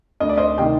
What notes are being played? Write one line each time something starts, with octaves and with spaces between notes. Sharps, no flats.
D2 D#5
D5
C5 D#5
C3 D#3 D#5 G5